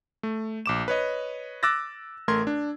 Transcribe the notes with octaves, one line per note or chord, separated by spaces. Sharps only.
A3
A#1 D6 E7
B4 C#5 D#5
D6 E6 F#6 A6 A#6
A1 A3 A#4 C6 G#6
D4